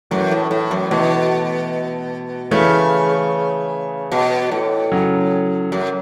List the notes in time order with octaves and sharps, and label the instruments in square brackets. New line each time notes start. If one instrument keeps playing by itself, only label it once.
[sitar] F#2 [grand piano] E3 A3
[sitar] A2
A2
F#2
[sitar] B2 [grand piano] E3 A3
[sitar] C#3 [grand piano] E3 A3
[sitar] B2
A2
[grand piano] C#3 F#3
[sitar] F#2